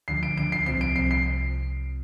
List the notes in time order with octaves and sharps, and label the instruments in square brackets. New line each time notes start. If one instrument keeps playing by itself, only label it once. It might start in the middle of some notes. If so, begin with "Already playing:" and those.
[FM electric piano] D2 D3 F3 [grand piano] C7
[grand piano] D7
[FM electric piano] D2 D3 F3 [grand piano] D7
[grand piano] C7
[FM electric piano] C2 C3 F3 C4 [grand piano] C7
[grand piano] D7
[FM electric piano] C2 C3 F3 C4 [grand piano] C7
[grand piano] C7